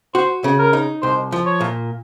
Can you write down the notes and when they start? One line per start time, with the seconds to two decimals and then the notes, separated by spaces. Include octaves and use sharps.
0.15 F#4 C5
0.44 C#3
0.59 A#4
0.73 D#4
1.02 C2 C5
1.32 F3
1.46 C#5
1.61 A#2